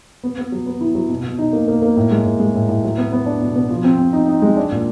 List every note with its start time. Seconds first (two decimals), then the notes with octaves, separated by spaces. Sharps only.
0.24 B3
0.38 B3
0.52 F#3
0.66 B3
0.81 E4
0.95 F#3
1.10 B2
1.24 B2
1.39 D#4
1.53 A#3
1.68 A#3
1.82 A#3
1.96 A2
2.11 G#3
2.25 A2
2.40 G#3
2.55 A2
2.68 A2
2.84 F#3
2.98 B3
3.12 B3
3.26 D4
3.42 B2
3.56 B3
3.70 F3
3.84 C4
3.98 C4
4.13 D#4
4.28 D#4
4.42 G#3
4.57 D4
4.72 A#2